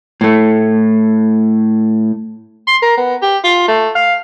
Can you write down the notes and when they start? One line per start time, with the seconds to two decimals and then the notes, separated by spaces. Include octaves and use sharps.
0.21 A2 A3
2.67 C6
2.82 A#4
2.97 B3
3.22 G4
3.44 F4
3.68 A3
3.95 F5